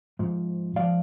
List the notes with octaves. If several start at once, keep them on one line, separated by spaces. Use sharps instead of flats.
G#2 F3
G#2 F3 D5 F5